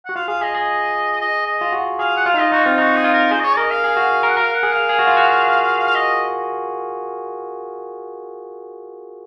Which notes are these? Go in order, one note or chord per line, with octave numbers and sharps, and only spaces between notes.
F#4 F#5
F4 F5
G#4 F5
G#4 D#5
G#4 D#5
D#5
D#5
F4
F#4
G#4 F5
F#5
F4 F5
D#4
F4 D#5
D#4 F#4
C4 F4
D#4 F#4
G#4
F4
A#4
G#4 C5
D#5
C#5
A#4 D#5
F5
G#4
F#4
A#4
F#5
A#4 F5
F#5
G#4
F5
G#4
F#4
F4
F#4
F5
D#5